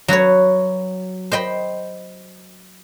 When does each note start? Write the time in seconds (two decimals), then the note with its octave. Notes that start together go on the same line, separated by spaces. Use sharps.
0.08 F#3 F#4 B4 C#5
1.32 C5 D#5 G5 B5